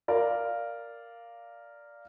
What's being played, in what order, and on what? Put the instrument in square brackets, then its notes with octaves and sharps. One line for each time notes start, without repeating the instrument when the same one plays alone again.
[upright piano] A#4 D5 F5